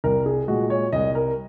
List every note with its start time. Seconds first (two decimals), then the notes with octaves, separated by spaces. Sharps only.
0.04 C2 A#4
0.26 G#4
0.48 A#2 G#3 F#4
0.70 C#5
0.93 C2 D#5
1.15 A#4